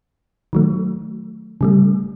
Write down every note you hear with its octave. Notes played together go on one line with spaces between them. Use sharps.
D#3 F#3 A3
C#3 G3 A3